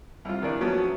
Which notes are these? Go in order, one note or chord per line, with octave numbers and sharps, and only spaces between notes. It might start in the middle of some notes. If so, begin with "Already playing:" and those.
C2 F4
D#3 E3 D4
F3 F#3 A3 B3 C#4